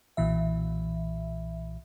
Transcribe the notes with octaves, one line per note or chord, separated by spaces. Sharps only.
B1 A#2 E3 E5